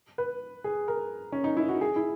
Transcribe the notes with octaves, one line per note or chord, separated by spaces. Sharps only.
B4
G#4
A#4
C#4
D#4
E4
F#4
G#4
E4